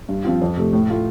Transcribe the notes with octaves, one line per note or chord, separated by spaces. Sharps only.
G2
F3 C4 F4
F2
C3 A3
A2
A3 F4